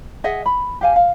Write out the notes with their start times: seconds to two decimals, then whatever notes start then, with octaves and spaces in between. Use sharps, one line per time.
0.24 G#4 D#5 E5 F#5
0.46 B5
0.81 G4 F5 G#5
0.96 F5